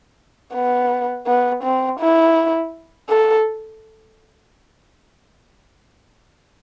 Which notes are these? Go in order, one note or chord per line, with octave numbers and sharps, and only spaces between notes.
B3
B3
C4
E4
A4